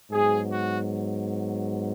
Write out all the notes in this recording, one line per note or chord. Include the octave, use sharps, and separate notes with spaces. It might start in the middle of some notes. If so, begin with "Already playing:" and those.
G#2 F#3 B3 G#4
F#4